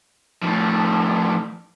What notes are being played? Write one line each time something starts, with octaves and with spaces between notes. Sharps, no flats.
A2 F3